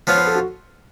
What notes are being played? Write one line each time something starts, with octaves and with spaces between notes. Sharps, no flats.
F3 B3 F4 C#5
B4
A4
F#4